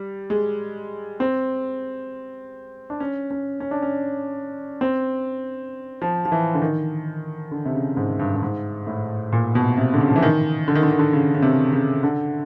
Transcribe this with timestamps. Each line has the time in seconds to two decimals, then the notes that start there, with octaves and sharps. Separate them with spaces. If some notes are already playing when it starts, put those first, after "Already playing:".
Already playing: G3
0.30 G#3
1.20 C4
2.90 D4
3.00 C#4
3.31 C#4
3.60 C#4
3.71 D4
3.82 C#4
4.81 C4
6.02 F3
6.25 F3
6.32 E3
6.54 D3
6.62 D#3
7.51 D3
7.65 C3
7.74 C#3
7.97 G#2
8.19 G2
8.36 G2
8.43 G#2
8.87 A2
9.32 A#2
9.55 B2
9.77 C3
9.94 D3
10.00 C#3
10.08 F3
10.16 E3
10.22 D#3
10.68 D3
10.75 D#3
10.83 D3
10.91 D#3
10.99 D3
11.13 C#3
11.34 C#3
11.42 C3
11.73 C#3
12.03 D3